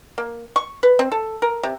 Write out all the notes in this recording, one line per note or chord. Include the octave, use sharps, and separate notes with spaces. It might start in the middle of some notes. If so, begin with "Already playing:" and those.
A#3
C#6
B4
C4
A4
A#4
C3